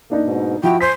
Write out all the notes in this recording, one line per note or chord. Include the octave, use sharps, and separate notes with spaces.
A#3 D4 D#4
G#2 B2
F3 E4 F#4 G5
C5 G#5 B6